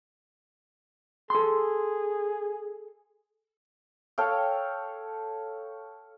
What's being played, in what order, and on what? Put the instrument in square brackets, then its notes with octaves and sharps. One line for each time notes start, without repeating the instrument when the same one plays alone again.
[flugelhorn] G#4 [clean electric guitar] A4 C6
[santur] A4 C#5 F5 G5